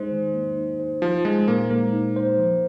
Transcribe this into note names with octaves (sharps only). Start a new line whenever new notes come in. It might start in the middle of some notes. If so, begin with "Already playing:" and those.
Already playing: G#3 D#4 C5
D#3
A#3
D#4
C5
F3 D#4
G#3 C5
A#2 A#3
G#3 A#3
D#4
C5
F3